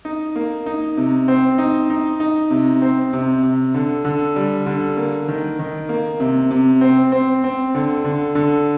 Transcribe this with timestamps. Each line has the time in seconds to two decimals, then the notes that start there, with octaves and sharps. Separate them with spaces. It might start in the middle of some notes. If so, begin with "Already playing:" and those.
0.05 D#4
0.36 A#3
0.66 D#4
0.97 C3
1.28 C4
1.58 D#4
1.90 D#4
2.20 D#4
2.50 C3
2.82 C4
3.13 C3
3.43 C3
3.74 D3
4.05 D3
4.36 G3
4.66 D3
4.97 A#3
5.28 D#3
5.59 D#3
5.89 A#3
6.20 C3
6.51 C3
6.81 C4
7.12 C4
7.44 C4
7.75 D3
8.04 D3
8.35 D3